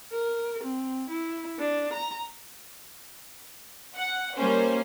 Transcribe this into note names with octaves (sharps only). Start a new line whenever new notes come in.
A#4
C4
E4
D4
A#5
F#5
G3 A#3 C#4 C5